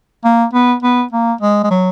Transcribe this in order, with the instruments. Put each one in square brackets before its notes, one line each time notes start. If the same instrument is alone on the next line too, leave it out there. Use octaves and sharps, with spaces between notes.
[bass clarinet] A#3
B3
B3
A#3
G#3
G#3
F#3